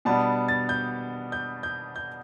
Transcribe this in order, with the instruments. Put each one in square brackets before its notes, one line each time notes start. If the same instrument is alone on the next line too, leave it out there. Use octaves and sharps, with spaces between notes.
[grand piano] B2 G3 B3 D4 A5
A6
G6
G6
G6
G6